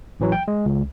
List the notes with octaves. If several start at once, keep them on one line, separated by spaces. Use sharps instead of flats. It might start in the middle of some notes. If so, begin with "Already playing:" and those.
A1 E3 F#3
G5
G#3
C#2